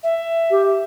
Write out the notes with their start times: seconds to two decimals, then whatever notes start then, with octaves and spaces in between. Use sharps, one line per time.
0.03 E5
0.51 G4